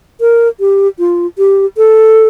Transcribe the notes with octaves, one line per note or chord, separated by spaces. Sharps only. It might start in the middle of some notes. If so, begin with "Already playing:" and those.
A#4
G4
F4
G4
A4